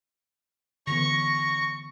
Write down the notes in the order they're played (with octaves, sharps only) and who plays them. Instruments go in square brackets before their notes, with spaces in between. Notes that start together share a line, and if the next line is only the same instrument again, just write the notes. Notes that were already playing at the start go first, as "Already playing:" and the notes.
[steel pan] D3 E3 B3 [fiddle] C#6 [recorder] A#6